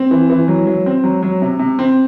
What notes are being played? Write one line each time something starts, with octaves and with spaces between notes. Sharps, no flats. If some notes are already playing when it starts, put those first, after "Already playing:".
Already playing: C4
E3
E3
F#3
F#3
C4
F#3
F#3
C3
C3
C4